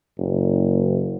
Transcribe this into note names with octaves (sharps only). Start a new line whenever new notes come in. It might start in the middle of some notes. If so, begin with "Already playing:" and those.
F#1